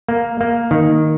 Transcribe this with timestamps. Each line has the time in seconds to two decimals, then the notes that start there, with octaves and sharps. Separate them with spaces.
0.09 A#3
0.41 A#3
0.71 D#3